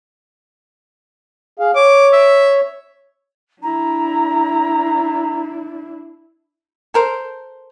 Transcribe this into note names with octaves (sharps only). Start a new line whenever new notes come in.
G#4 F5
C#5 D6
E5
D4 E4 A#5
A4 A#4 C5